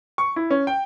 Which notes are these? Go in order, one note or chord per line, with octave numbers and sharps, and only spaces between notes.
C#6
E4
C#4
G5